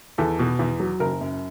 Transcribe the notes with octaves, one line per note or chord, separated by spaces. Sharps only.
E2 A4
B2
E2
F#3
F#1 A#4
F#2